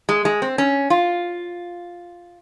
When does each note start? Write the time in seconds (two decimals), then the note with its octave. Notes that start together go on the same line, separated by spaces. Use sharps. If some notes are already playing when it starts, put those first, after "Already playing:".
0.09 G#3
0.25 G#3
0.42 C4
0.58 C#4
0.90 F4